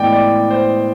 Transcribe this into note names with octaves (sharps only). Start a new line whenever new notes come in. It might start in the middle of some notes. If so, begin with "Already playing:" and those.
Already playing: A2 E3 G#3 B3 D5 D#5 G5
D5
C5